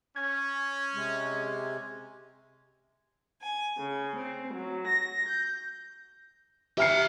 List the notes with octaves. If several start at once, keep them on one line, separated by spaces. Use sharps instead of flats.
C#4 G#6
C3 G#3
G#5
C#3
C4
F#3
A#6
G6
G4 E5 A#5 F6 C7